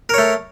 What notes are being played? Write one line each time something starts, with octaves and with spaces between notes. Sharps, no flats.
A3 A#4 C#5